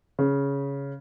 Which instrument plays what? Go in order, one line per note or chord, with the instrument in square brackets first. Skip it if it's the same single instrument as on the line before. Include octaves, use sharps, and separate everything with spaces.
[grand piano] C#3